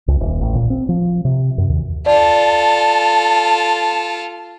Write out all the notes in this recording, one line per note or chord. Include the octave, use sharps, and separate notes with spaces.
C#2
D#1
A1
A#2
C4
F3
C3
F#2
D#2
F4 A4 D5 A5